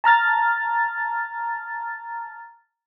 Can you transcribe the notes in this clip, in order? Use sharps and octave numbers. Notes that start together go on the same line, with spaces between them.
A5 A#5 F6 A6